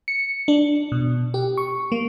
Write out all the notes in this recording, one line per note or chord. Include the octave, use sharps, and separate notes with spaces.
C#7
D4
B2
G4
C#6
A#3